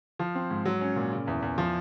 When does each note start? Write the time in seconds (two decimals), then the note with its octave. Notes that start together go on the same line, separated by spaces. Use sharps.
0.19 F3
0.35 C4
0.51 G#2
0.65 F#3
0.81 C#4
0.96 A#2
1.11 C#3
1.28 E2
1.42 E2
1.58 F3